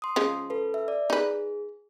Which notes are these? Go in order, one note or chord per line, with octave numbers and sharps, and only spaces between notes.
C6 D#6
C#3 F3 G#3
A4 B4
E5
D5
D#4 G#4 B4